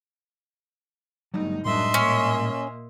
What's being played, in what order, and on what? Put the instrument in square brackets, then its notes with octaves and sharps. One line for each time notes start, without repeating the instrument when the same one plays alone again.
[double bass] G1 D#4 [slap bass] F#3 G3 A3
[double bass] F#2 D4 [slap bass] A2 G3 G#3 [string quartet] D#5 E5 C6
[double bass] A#2 A#3 [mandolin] C#4